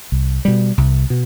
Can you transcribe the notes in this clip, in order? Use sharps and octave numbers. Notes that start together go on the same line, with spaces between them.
C2
B2 G3
C2
B2